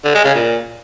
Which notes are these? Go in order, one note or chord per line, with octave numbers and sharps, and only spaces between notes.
D3
G#3
C#3
A#2